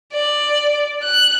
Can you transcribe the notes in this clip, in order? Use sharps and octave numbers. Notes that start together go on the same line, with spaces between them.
D5
F#6